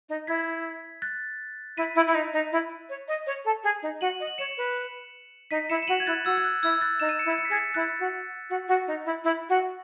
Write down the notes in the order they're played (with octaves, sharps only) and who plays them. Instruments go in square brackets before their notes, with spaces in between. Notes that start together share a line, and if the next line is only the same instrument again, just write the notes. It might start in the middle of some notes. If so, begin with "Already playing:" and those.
[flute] D#4
[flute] E4 [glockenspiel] G#6 B6
[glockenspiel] F#6 A6
[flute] E4 [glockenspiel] B6 D#7
[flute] E4
E4
D#4
D#4
E4
C#5
D#5
C#5
A4
G#4
D#4
[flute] F#4 [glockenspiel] D#7 F#7
[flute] D#5
[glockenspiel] F#7
[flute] C#5 [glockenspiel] C#7 E7
[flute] B4
[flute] D#4 [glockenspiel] B6 D#7
[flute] E4 [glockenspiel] C#7 E7
[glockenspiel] E7
[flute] F#4 [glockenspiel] D#7 F#7
[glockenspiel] G#6
[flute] E4 [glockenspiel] F#6 A6
[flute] F#4 [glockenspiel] E6 G#6
[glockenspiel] G#6
F#6
[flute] E4 [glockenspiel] E6 G#6
[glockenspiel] F#6 A6
[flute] D#4 [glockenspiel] E7
[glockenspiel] D#7
C#7 E7
[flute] E4
[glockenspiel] C#7
B6
[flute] G#4 [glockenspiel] A6 C#7
[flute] E4 [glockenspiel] F#6 A6
[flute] F#4
F#4
F#4
D#4
E4
E4
F#4